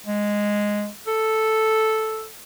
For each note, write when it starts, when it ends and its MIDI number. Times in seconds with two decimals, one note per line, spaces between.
0.06 0.89 56
1.07 2.27 69